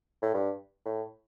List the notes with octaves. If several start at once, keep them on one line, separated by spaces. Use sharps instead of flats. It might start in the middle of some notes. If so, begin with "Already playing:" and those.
A2
G2
A2